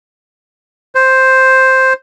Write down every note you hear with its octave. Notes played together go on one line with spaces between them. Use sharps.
C5